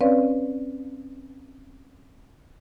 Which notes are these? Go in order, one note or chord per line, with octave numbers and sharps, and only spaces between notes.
C4 C#4 B4 C#5 D5 F5